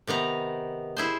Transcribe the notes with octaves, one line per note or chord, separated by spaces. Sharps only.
C3 D#3 B3 A#5
E4 G#4 C5